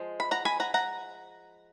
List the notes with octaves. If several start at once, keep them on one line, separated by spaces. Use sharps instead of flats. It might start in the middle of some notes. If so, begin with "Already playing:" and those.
Already playing: F3 G#3
B5
F#5 A#5
G#5 B5
F#5 A#5
F#5 A#5